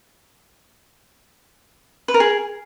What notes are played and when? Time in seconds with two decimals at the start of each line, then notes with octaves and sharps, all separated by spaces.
2.08 B4
2.14 A#4
2.20 G#4